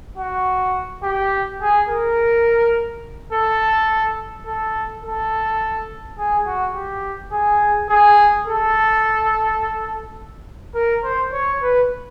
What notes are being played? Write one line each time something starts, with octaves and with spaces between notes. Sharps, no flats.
F#4
G4
G#4
A#4
A4
A4
A4
G#4
F#4
G4
G#4
G#4
A4
A#4
C5
C#5
B4